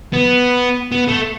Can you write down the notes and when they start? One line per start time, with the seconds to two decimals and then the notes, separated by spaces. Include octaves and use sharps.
0.13 B3
0.92 B3
1.08 A3